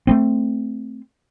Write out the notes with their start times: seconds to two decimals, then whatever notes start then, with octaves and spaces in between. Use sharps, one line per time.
0.07 A3 B3 C4